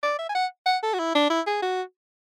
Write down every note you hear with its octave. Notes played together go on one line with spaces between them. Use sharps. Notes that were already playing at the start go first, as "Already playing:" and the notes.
D5
E5
G#5
F#5
F#5
A4
F#4
E4
D4
E4
G#4
F#4